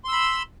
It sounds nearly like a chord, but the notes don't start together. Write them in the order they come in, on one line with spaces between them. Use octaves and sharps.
C6 E6 B5